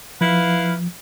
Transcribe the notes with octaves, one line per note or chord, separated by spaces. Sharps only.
F3 E4 B4 F5